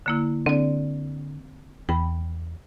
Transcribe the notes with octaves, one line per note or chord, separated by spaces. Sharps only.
D3 A#3 E4
D3 C4 D5
E2 G5 B5